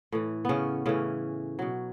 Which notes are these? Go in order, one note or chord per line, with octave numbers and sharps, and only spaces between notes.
A2 E3
C#3 B3 C#4
A2 C#3 E3 C#4
B2 F#3